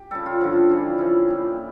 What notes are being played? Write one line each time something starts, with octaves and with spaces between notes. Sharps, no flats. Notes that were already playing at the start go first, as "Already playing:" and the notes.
Already playing: G4
C#3 G3 A4
F4
G2 D3 F3
C#3 E3 G3
C#3 F3 E4
A#2 G3